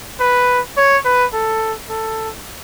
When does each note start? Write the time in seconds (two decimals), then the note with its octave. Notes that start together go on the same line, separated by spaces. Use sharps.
0.20 B4
0.77 C#5
1.05 B4
1.33 A4
1.89 A4